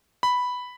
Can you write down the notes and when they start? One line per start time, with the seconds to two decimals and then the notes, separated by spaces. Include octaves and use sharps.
0.23 B5